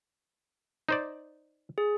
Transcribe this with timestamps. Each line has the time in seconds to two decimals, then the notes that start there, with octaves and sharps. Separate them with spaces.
0.89 D#4 C5 D5
1.78 G#4